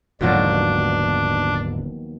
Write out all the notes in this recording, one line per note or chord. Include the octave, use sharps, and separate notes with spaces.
D#1 D#2 G#2 B2 D3 F3 F#3 D4